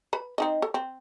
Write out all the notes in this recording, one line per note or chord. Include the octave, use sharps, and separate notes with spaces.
B4 B5
C4 D#4 D#5
A4
C4